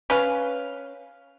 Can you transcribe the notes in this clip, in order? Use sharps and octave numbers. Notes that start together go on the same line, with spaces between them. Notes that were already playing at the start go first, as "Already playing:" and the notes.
C#4 B4 F5